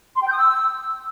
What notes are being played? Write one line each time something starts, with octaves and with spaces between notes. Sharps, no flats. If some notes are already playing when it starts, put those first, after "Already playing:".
C6
G5
G6
D#6
E6